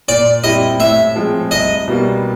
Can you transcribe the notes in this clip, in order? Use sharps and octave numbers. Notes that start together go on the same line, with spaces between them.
A#2 D5
G3 C4 E4 G4 D#5
A2 E5
F3 G#3 C4
C2 D#5
B2 G3 A#3